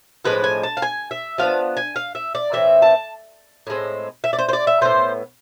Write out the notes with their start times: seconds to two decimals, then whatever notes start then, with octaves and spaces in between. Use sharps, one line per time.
0.25 A2 F3 G#3 D4 B4
0.44 G#5
0.63 A5
0.77 F5
0.82 G#5
1.11 E5
1.38 F3 B3 D4 F5
1.77 G#5
1.96 F5
2.15 E5
2.35 D5
2.53 A2 E3 A3 C4 E5
2.82 A5
3.67 A2 G#3 C4
4.24 E5
4.33 D5
4.39 C5
4.49 C5
4.53 D5
4.67 E5
4.81 A2 E3 B3 C5